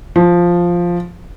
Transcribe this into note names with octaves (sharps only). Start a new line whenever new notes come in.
F3